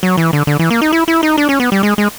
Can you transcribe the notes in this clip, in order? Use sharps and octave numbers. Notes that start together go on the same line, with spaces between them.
F#3
E3
D3
D3
E3
A#3
D#4
E4
E4
D#4
D4
C#4
B3
G3
G#3
G#3